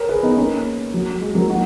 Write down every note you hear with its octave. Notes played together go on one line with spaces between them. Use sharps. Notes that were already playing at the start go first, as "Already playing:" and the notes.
Already playing: A#4 C#5
G#4 B4
B3 D#4
A#3 C#4
F#3
G#3
F#3 A#3
D#4 F#4